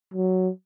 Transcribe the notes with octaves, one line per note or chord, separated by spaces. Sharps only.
F#3